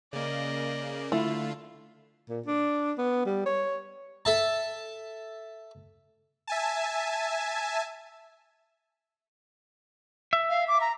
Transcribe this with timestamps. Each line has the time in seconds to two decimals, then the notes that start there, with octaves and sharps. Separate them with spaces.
0.13 C#3 A#3 D5 D#5
1.12 D3 A3 E4 F4
2.30 A#2
2.46 D4
2.98 B3
3.26 G3
3.46 C#5
4.25 A4 E5 A5
6.47 E5 G#5 A5
10.33 E5
10.49 F5
10.68 D6
10.81 A#5